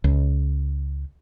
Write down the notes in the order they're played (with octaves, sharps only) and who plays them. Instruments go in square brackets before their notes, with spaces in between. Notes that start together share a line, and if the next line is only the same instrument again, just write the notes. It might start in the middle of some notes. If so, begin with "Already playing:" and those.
[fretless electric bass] C#2